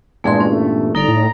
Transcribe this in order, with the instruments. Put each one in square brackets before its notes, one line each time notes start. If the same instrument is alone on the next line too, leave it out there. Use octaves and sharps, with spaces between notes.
[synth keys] E2 G2 A#2 [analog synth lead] G#3 [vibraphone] A3 G#4 C6
[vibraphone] C#4
[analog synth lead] A3
[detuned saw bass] G1 [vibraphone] D#4 A4 D5 [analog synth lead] A#5
[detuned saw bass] A2